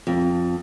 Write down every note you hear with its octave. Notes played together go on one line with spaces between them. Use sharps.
F2